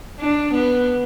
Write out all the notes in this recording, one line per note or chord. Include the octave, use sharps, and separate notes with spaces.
D4
B3